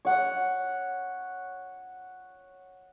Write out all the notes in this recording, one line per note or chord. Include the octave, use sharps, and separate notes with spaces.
C#5 F#5